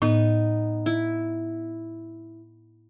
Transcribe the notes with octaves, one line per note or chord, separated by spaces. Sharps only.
A2 B3 D#4
E4